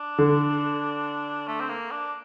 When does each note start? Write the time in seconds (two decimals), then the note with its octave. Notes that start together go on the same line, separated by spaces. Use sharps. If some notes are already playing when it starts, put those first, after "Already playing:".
Already playing: D4
0.18 D3
1.47 A3
1.60 C4
1.69 A#3
1.91 D4